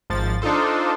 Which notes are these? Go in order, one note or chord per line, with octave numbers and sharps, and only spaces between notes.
G#1 F3 A6
D4 D#4 F4 A4 C5